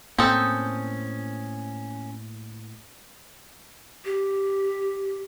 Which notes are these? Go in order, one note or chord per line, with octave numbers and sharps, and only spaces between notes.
A2 A#3 C4 C#4 A4 D#6 G6
G4